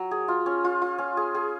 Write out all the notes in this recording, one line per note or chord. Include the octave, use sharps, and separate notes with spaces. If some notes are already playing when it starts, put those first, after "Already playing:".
Already playing: F#3
G#4
F4
C#4
F4
F4
C#4
G#4
G#4